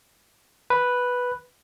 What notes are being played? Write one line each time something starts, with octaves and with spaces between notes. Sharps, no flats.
B4